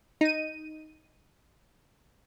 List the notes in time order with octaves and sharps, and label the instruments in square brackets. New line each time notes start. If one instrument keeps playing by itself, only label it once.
[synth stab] D#4 D#7